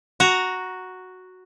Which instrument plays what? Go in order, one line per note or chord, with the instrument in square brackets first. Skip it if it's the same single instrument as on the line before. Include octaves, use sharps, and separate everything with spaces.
[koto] F#4 A#5